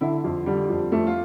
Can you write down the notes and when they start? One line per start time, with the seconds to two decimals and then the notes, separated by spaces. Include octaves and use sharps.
0.01 D3 E4
0.24 F2
0.46 D3 G3
0.69 F2
0.92 F2 A3
1.07 F4